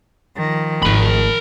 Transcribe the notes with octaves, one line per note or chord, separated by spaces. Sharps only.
D#3 F3
G#1 A3 A#4 B5